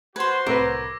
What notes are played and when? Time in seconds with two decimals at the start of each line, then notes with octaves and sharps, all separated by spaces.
0.16 F#4 B4 C5 C6 G#6
0.46 C2 A2 A#4 B4 D6 E6 A#6